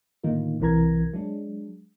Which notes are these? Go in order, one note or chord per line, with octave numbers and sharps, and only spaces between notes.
A2 D3 D#3 A#3 D#4 F4
B1 C3 E3 A#4 A#5 G#6
F#3 G#3 D4